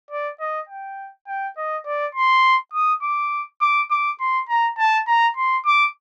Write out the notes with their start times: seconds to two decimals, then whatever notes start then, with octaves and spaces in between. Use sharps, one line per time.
0.11 D5
0.40 D#5
0.69 G5
1.28 G5
1.57 D#5
1.86 D5
2.15 C6
2.73 D#6
3.03 D6
3.61 D6
3.91 D6
4.20 C6
4.49 A#5
4.78 A5
5.07 A#5
5.37 C6
5.66 D6